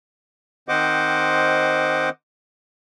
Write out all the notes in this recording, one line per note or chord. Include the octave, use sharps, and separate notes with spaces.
D#3 C4 C5 D#5 F#5 D6